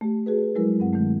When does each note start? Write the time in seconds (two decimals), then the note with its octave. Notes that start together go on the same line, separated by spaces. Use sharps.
0.01 A3 G4
0.26 F#4 G#4 B4
0.55 F3 F#3 G#3 E4 A#4
0.80 G2 C4 F#5
0.93 D#3 G#3 A3